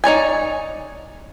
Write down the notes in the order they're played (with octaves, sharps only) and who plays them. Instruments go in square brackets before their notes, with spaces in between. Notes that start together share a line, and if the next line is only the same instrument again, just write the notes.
[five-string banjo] D#4 C#5 D5 G#5